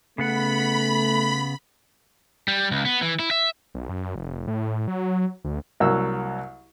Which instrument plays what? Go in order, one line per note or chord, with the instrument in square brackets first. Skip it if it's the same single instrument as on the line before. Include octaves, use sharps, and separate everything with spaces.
[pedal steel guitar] C#3 B3 F#5 [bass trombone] A3 [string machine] B5
[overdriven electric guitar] G3
C#2
B3
E3
E4
E5
[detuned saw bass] B1
F#2
F1
A2
F#3
D2
[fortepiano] C2 F#3 A#3 E6